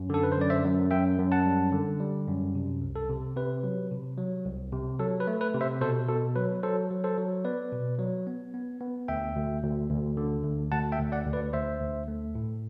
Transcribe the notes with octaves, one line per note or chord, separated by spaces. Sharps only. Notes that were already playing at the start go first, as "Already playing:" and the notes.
Already playing: F#2
D3 A4
B4
C5
F#2 D5
C5 E5
F#2
F#2 E5 G5
F#2
F#5 A5
G3
D3
G3
F#2
C3
C2
A4
C3
C3 B4
F#3
C3
F#3
C2
C3
F#3 A4
B4
A3
B4
C3
C5 E5
B2 A4 C5
B2 A4
F#3 B4
F#3 A4 C5
F#3
A4 C5
F#3
B3 B4 D5
B2
F#3
B3
B3
B3
D2 E5 G5
D2
D2
D2
D3
D2
D2 F#5 A5
E5 G5
D2
D5 F#5
D2
B4 D5
D2 C5 E5
D2
A3
A2